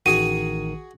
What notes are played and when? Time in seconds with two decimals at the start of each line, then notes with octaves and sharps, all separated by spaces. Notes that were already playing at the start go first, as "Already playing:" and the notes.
0.06 A1 D#3 F#4 G#4 D#7